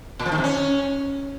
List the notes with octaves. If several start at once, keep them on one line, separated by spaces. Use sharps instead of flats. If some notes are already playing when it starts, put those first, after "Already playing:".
A#2
F3
D#3
C3
C#4